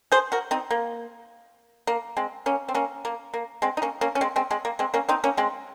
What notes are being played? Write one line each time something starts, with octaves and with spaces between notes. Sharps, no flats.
G#4 C5
F#4 A#4
C4 D#4
A#3
A#3
G#3 C4
A#3 C#4
C4
A#3 C#4
A#3
A#3
G#3 C4
D#4
A#3 C#4
A#3 C#4
C#4
G#3 C4
G#3 C4
G#3 C4
A#3
G#3 C4
A#3 C#4
C4 D#4
A#3 C#4
G#3 C4